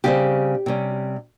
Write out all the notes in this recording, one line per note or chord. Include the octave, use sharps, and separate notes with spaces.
C#3 G3 C4 G4
C3 G3 C#4